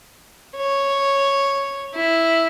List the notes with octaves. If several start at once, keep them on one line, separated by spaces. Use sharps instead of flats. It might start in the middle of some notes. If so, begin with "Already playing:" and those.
C#5
E4